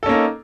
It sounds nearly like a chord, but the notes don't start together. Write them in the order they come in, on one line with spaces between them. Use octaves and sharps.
A4 C#4 A#3 D#4